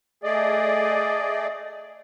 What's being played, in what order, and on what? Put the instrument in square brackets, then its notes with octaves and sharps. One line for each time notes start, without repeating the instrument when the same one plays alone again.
[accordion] A3 G#4 D5 [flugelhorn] D#5